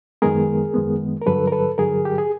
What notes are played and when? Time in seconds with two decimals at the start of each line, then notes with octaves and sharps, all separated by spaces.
0.22 F#2 D#3 G#3 B3 G#4 A#4
0.74 F#2 D#3 G#3 B3
1.21 A#4
1.26 G2 D3 F#3 A4 B4
1.47 A#4
1.52 A4 B4
1.78 G2 D3 F#3 G#4 A#4
2.05 G4
2.18 G#4